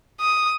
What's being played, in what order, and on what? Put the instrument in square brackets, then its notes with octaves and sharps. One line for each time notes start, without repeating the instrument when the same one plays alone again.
[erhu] D#6